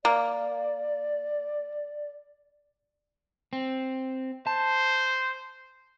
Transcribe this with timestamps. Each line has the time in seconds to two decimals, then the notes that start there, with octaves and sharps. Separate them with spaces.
0.05 A#3 D5
3.53 C4
4.47 C5 A5